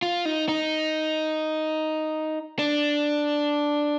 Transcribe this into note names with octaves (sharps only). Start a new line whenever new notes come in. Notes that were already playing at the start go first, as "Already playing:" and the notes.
F4
D#4
D#4
D4